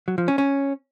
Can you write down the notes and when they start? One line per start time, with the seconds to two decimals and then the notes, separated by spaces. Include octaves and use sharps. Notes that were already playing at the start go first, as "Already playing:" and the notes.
0.08 F#3
0.18 F3
0.28 C#4
0.38 C#4